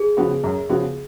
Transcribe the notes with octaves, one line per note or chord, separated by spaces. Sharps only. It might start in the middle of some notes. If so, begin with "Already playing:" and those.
Already playing: G#4
C#3 F3 B3 F#4
F#2
C#3 F3 B3 F#4